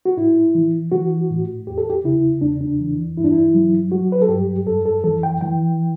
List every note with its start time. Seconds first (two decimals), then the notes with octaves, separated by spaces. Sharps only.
0.05 F#4
0.17 A2 E4
0.55 E3
0.92 E3 F#4
1.30 A2
1.67 E2 G4
1.78 A4
1.90 G4
2.04 C#3 E4
2.41 E2 D4
2.61 D4
2.80 E3
3.17 G2 E4
3.24 D4
3.32 E4
3.54 F#3
3.92 F#3 F#4
4.12 B4
4.22 A4
4.29 G2 G4
4.67 F#2 A4
4.85 A4
5.04 E3 A4
5.23 G5
5.41 E3 G5